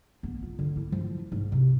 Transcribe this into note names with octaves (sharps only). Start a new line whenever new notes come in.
B3
F4
D3
E4
F3
G#2
C3